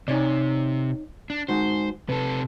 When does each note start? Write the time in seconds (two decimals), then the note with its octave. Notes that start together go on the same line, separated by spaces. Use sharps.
0.08 C3 D#4 C#5 D5
1.30 D4
1.49 G#3 D#4 F#4 C5
2.09 C3 A4 B4